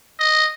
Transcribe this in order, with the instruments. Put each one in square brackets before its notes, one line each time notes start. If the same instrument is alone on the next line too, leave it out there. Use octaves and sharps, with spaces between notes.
[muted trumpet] D#5